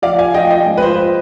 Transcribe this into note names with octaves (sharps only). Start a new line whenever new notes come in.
F3 D5 F5
F5 G#5
F3 D#5 G5
D#5 G5
G#2
B4
C5
C5